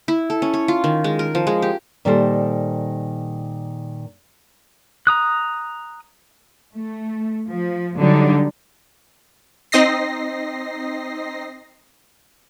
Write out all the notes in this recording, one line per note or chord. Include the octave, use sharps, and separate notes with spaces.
E4
A4
C#4
C#5
F4
D#3
G#3
A#4
F3
G#3
G4
A#2 D#3 G3 A4 C5
A#5 D#6 F#6
A3
F3
D3 F#3 G3 D4 D#4
C4 D#4 D#5 A#6 C7